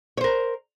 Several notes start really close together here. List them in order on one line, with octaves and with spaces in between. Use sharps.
C#5 C5 A#4